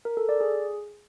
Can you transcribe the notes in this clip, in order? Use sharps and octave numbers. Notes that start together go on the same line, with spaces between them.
A#4
A4
D5
G#4